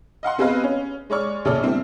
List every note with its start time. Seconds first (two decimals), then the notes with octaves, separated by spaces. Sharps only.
0.23 D#5 F5 F#5 C6
0.38 B3 C4 G#4 B4 D#5 F5
0.63 C#4
1.10 G#3 C#5 D5 C#6 F6
1.45 A#1 C#3 A4 C#5 D5 F6
1.63 G3 A3 B3 C4 D4 E4